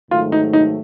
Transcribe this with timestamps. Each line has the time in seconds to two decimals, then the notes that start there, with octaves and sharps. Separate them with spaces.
0.11 G#2 D#3 F#3 A3 F4
0.32 D#4
0.53 D#4